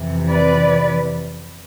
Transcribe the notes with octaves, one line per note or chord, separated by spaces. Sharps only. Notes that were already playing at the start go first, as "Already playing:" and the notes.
Already playing: F2 C3 E3
B4 D5